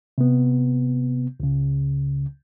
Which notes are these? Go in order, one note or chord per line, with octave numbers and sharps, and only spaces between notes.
C3 B3
C#2 C#3